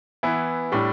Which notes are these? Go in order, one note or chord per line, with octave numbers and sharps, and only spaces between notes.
E3 B3 E4
A2 G3 D4